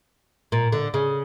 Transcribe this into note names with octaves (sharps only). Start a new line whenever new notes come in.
A#2
D3
C#3